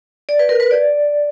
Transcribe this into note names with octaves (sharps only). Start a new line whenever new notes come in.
D5
B4
A#4
B4
D5